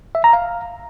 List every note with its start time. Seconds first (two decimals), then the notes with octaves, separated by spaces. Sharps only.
0.15 E5
0.24 A#5
0.33 F5